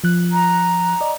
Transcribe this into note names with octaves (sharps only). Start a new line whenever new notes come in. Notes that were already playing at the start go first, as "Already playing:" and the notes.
F3 F#6
A#5
D5 D#5